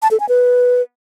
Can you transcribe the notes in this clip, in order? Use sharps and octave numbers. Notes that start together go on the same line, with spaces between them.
A5
A4
G#5
B4